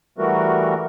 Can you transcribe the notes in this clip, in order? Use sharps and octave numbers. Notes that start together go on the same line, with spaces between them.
E3 G3 A3 F#4 A#4